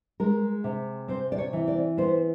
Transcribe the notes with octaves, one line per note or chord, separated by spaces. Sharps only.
G#3 A#4
C3
C4 C5
D5
C#5
E3
D5
B3 C5